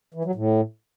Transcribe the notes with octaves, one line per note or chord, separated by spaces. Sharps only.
E3
F#3
A2